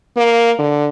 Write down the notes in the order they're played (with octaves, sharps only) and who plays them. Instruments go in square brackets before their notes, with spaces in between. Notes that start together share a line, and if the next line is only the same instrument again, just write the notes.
[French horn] A#3
D3